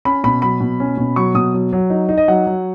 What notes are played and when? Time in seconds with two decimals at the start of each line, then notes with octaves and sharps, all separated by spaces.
0.05 C#4 B5
0.24 B2 B5
0.42 F#3 B5
0.61 B2
0.80 C#4
0.98 B2
1.16 F#3 C#6
1.34 B2 D#6
1.54 F#3
1.73 F#3
1.90 D#4
2.09 D#4
2.18 D#5
2.28 F#3 F#5
2.47 F#3